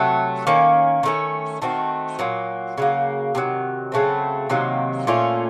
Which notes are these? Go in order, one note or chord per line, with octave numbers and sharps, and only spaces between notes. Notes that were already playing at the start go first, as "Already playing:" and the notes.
Already playing: C3 F#3 A3
D#3 A#3 C#4
D#3 A3 C#4
D#3 A3 C4 F#4
A#2 F#3 A#3
C#3 F#3 A#3
C3 D#3 F#3
C#3 F#3 A3 C4
C3 D#3 F#3 A#3
A#2 A3 C#4 F4